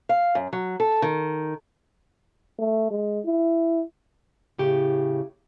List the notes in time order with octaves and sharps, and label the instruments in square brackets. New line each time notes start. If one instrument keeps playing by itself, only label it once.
[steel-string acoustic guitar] F5
F#2
F#3
A4
D#3
[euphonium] A3
G#3
E4
[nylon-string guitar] A2 C#3 G4